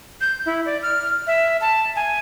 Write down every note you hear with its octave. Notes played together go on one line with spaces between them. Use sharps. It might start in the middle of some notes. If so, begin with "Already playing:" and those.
G6
E4
D5
F6
E5
A5
G#5